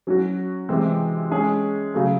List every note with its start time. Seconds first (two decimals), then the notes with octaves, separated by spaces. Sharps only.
0.07 F#3 C#4 F#4
0.69 C3 E3 G#3 C4
1.31 G#3 C#4 G#4
1.94 C#3 F#3 A3